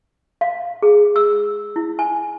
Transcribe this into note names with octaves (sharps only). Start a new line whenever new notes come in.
F5
G#4
E6
E4
G#5